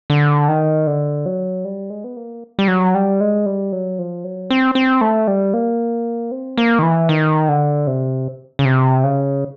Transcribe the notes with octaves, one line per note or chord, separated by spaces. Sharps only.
D3
D#3
D3
F#3
G3
G#3
B3
A#3
G3
F#3
G3
G#3
G3
F#3
F3
F#3
C4
C4
A3
G3
A#3
C4
A#3
D#3
E3
D#3
D3
C3
C#3
C3
C#3